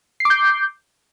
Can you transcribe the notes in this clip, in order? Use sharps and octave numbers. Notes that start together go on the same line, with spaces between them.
D6 G6 C7